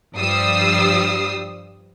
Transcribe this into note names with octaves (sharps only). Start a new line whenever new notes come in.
G2 F3 G3 D#6 E6 C7